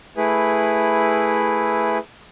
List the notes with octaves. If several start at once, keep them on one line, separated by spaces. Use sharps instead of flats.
A3 E4 G#4 B4